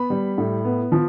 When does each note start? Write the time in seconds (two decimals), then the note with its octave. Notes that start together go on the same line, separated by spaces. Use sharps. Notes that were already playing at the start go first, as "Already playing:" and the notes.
Already playing: B3 B5
0.10 G3
0.38 A2
0.65 B3
0.92 F3